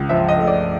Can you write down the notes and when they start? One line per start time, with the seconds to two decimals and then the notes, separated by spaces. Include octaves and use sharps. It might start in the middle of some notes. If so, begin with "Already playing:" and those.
Already playing: C#2
0.09 F3 E5
0.29 D#5
0.38 A3
0.47 D5